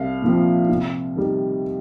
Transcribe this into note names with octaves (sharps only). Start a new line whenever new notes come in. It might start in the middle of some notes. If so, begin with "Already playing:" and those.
Already playing: C2 F5
A#2 F3 C4
C3
D#3 G3